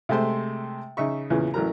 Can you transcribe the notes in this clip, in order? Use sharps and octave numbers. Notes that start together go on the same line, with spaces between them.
C3 G#3 A3 C5 C6
C#3 D#4 E5 C#6
E2 A#2 C#3 E3 B3
A1 E3 F#3 A#4 A#5